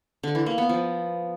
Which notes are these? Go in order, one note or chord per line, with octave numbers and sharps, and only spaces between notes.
D3
E3
A#3
B3
F3